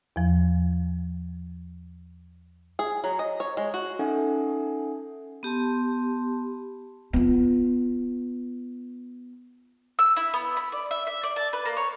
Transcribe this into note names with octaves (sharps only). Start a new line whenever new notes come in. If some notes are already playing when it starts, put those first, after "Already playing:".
E2 F3
G#4
F#3
D#5
C#5
G#3
F#4
C#4 D#4 A4 E5 F#5 G#5
B3 G4 A5 C6
B3 F4
E6
E4
B3
B5
D5
E5
E5
D5
A5
B4
A#3
C#5